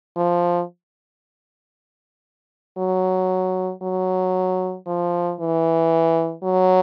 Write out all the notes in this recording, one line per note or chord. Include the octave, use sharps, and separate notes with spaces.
F3
F#3
F#3
F3
E3
F#3